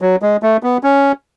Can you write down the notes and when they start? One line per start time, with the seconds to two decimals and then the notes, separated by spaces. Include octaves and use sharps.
0.02 F#3
0.22 G#3
0.43 A3
0.63 B3
0.83 C#4